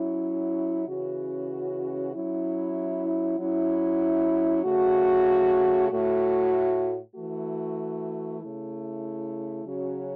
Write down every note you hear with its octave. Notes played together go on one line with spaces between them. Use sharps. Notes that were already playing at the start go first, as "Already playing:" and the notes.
Already playing: F#3 C#4 E4
C#3 E3 C#4 F#4
F#3 C#4 E4
F#3 C#4 E4
C#3 A3 F#4
A2 A3 F#4
E3 A3 F#4
C#3 A3 E4
C#3 F#3 C#4 F#4